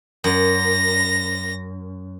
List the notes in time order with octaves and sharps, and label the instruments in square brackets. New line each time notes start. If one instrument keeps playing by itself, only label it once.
[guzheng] F#2 [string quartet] A#6